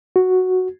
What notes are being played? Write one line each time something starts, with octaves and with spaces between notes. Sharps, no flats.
F#4